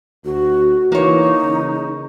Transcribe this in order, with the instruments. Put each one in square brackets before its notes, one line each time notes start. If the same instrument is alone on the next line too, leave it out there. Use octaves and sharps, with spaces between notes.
[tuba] D2 [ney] F#4
[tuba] E3 [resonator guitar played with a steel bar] A#3 C#5 [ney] D#4
[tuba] C#3